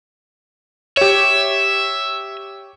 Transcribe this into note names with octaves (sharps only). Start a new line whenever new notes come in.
G4 C#5 E5